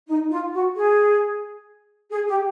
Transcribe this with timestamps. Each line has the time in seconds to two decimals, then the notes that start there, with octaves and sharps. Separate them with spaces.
0.08 D#4
0.30 F4
0.53 F#4
0.75 G#4
2.11 G#4
2.27 G4